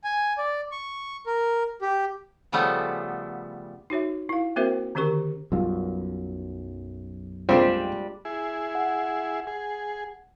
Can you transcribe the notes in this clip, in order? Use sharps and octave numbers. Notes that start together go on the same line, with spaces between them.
G#5
D5
C#6
A#4
G4
C#3 F3 G3 A3 B3
D#4 F#4 C#5 E5
E4 F5
A#3 C4 F#4 A#4 C5 E5
D3 D#3 C#4 G4 A#4 C#6
B1 F#2 G3 F4
G3 G#3 A#3 C4 D4 F4 G4
E4 G#4
F#5
G#4